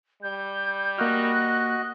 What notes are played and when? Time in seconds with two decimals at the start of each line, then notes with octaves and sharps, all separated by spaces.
0.23 G3 G6
0.98 A#3 F#4 D#5 F6 F#6